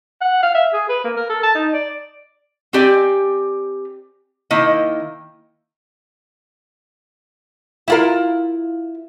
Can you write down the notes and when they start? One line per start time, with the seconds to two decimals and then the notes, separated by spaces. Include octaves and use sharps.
0.21 F#5
0.43 F5
0.54 E5
0.73 G#4
0.89 B4
1.04 A#3
1.17 A#4
1.29 A4
1.43 A5
1.55 D#4
1.73 D5
2.73 C4 G4 D5 G#5
4.51 D#3 A#3 E4 D#5
7.88 E4 F4 A#4